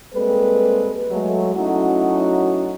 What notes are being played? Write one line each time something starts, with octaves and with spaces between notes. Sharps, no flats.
G3 G#3 A#3 C4 A4 B4
F#3 G#3 A3
F#3 A3 C#4 D#4 E4 F#4